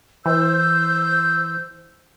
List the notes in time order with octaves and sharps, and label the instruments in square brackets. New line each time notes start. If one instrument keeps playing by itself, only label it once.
[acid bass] E3 [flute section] C5 E6 G6